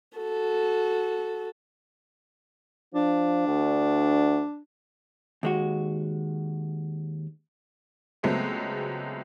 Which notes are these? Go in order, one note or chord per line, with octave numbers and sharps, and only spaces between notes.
F#4 A4
F3 D4
D2
D#2 G#3 F#4
C#2 F#3 G#3 A3 B3 C4